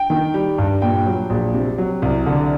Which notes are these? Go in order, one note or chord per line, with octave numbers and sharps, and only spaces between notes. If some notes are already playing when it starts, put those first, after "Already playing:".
Already playing: G5
D#3
G3
G2
A#2 G5
F#3
A#1
C3
F#3
C2
D3